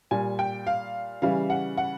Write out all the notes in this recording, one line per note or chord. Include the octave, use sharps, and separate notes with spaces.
A#2 G3 G#5
G5
F5
C#3 E3 G3 F5
F#5
F#5